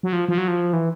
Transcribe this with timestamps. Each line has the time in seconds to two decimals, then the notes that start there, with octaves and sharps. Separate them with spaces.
0.03 F#3
0.13 F3
0.28 F3
0.38 F#3
0.48 F3
0.73 E3